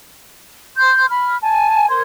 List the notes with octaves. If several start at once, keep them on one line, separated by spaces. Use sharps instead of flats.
C6 G6
B5 F6
G#5 A5
A#4 C5 C6 G#6